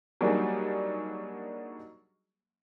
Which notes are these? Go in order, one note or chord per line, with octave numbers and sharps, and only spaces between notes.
F#3 G3 A#3 D4 D#4 G#4